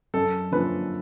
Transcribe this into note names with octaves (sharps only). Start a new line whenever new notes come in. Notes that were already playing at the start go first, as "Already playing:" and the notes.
F#2 A4
D3 F3 A#3 C#4 B4